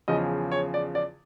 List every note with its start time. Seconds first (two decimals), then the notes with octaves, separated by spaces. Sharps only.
0.08 E2 C#3 F3 D#5
0.52 C#5
0.74 D5
0.95 D5